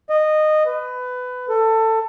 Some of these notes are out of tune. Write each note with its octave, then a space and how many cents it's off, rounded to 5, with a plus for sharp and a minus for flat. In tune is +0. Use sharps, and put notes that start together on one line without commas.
D#5 -15
B4 +20
A4 +20